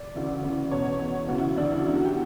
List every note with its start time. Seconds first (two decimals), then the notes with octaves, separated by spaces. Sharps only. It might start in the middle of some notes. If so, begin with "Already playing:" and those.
Already playing: D5
0.15 D2 C#3 E3
0.43 D2 C#3 E3
0.71 E2 B2 C#5
1.00 E2 B2
1.29 D2 C#3 E3 F#4
1.38 E4
1.57 D2 C#3 E3 D4
1.71 E4
1.86 E2 D3 E4
1.95 F#4
2.05 G4